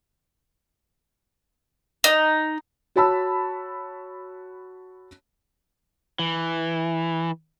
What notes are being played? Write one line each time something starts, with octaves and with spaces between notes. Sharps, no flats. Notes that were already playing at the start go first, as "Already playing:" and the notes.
D#4
F#4 C#5 A5 B5 E6
E3